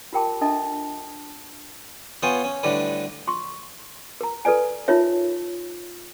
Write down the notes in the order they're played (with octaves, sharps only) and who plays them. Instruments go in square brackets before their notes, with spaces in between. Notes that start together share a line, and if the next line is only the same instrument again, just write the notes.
[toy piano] F4 G4 A#4 G5 A5 D6
D4 A4 D#5 E5 A5
[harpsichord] B3 F4 C#5 G5 G#5
C#4
A2 D3 G3 D4 B4
[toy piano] C6 C#6
A#4 A#5
A4 B4 D5 G#5
D#4 F4 A#4 C#5 E5